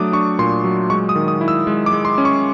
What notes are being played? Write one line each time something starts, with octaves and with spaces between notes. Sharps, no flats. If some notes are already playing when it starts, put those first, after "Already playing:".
Already playing: F#3 A3 D4 D6 D#6
D4 C#6
A#2 C6
F#3
G#3 C#6
D#6
D#3
D#6
E4
E6
G#3
D6
G#3
C6
C#4
C#6